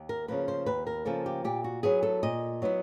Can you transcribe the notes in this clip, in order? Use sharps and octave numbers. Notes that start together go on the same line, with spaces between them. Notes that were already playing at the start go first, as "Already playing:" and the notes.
Already playing: D#2
A#4
C#3 F3 A#3 B4
C5
D#2 B4
A#4
C#3 F3 A#3 A4
G4
A#2 G4
F#4
F#3 B3 E4 G#4
A4
A#2 D#5
F#3 B3 E4